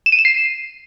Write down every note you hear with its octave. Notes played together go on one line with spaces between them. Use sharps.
E7
D#7
E7
C7